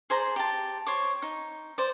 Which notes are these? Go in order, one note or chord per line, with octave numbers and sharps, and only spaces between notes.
G#4 C5 D5 A#5
G4 A5
C5 C#5 D6
D#4
C5 D5